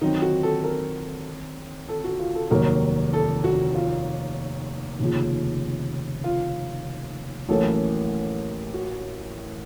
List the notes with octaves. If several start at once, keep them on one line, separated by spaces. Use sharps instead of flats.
D#3 F#3 C4 D#4
F#4
A4
A#4
A4
F#4
F4
A4
F1 D#2 D#3 F#3 A#4
A4
F#4
F4
F1 D#2 C#3 F3
F4
A1 A2 F#3 A#3 C#4 A4
F#4